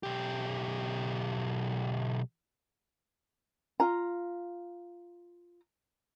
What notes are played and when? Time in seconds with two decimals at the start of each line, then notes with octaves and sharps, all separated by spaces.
0.03 B1 G4
3.80 F4 A#5